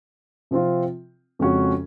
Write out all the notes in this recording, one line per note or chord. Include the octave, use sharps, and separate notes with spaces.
C3 F3 C4 F4
F2 C#3 G#3 C#4 F#4